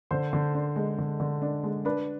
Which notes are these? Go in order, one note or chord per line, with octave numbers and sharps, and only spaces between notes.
D3 C5
D3
D4
G#3
D3
D3
D4
G#3
D4 B4